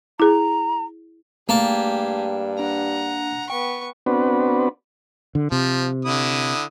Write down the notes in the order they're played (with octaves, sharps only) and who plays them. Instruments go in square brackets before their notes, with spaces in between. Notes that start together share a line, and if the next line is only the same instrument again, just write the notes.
[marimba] E4 G#4 [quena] A#5
[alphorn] G2 [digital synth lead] A3 [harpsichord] A#3 A5 [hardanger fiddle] G4 G#4
[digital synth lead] D4 [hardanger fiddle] F#5 A#5
[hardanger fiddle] B3 C#6 [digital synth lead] G5
[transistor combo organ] B3 C4 D4 F#4 B4
[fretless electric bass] D3
[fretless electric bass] C3 [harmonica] F3
[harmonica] D3 E4 D#6